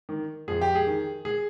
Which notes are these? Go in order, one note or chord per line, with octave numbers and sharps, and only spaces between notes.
D#3
F2 G#4
G4
G#4
D#3
G#4